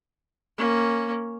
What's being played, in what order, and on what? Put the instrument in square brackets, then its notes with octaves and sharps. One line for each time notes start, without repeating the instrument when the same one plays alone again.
[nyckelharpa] A#3 C#4